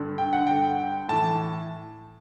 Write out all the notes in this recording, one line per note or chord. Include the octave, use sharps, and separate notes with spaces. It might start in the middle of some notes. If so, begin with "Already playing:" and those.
Already playing: G2 D3
G5
F#5
G2 D3 G5
A2 E3 A5